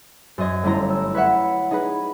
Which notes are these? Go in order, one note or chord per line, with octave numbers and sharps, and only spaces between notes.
F#2 C5 D#5 G#6
G1 A3 C#4 E4 C5 A#5
E6
B4 C#5 E5 F#5
D#4 G#4 B4